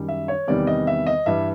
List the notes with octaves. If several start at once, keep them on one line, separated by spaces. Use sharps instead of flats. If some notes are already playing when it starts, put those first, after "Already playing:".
Already playing: F#2 D#3 G3
E5
C#5
E2 C3 D#3 G3 D5
D#5
E5
D#5
G2 E3 G3 E5